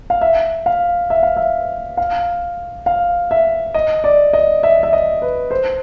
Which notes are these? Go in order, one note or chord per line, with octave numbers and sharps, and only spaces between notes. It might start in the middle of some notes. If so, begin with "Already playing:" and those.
F5
E5
F5
E5
F5
E5
F5
F5
E5
D#5
D5
D#5
E5
E5
D#5
B4
C5